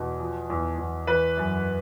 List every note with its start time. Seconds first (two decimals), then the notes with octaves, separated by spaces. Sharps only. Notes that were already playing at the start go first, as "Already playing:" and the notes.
Already playing: E2 B2
0.19 F3
0.50 E2
0.78 E2
1.07 E3 B4
1.37 F#2